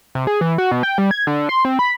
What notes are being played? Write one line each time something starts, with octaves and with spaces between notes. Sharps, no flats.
C3
G#4
E3
F#4
B2
G5
G3
G#6
D3
C6
C4
B5